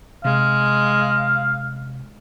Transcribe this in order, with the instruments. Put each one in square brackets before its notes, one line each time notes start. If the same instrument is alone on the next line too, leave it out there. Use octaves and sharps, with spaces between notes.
[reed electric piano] C3 [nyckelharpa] G#3 [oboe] F5